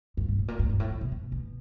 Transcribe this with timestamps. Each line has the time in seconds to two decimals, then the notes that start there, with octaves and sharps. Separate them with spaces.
0.17 G2
0.28 G#2
0.39 A2
0.48 A#2
0.59 G#2
0.70 G#2
0.80 A2
0.90 A2
1.01 B2
1.12 B2
1.32 B2